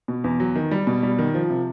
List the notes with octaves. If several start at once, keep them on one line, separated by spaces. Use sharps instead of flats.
B2
E2
F#3
D#3
G3
B2
G3
D#3
F3
C3